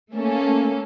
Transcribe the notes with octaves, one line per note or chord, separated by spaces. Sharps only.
A3 A#3 C#4 A4